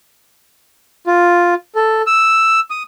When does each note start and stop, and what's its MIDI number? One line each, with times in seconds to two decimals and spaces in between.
1.07 1.54 65
1.75 2.02 69
2.07 2.60 88
2.70 2.83 87